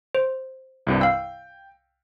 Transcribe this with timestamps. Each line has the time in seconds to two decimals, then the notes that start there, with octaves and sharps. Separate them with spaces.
0.15 C5
0.87 C2 G2 C3
1.01 F5 G5 E6